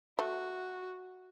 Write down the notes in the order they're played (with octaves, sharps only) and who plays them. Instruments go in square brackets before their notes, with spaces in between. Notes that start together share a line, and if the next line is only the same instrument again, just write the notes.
[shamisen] A3 [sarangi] F#4